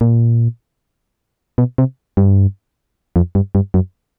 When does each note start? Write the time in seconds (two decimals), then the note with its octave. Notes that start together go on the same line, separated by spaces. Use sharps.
0.01 A#2
1.58 B2
1.78 C3
2.17 G2
3.16 F2
3.35 G2
3.55 G2
3.74 F#2